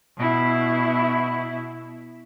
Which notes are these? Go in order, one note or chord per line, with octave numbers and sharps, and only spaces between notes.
B2 E4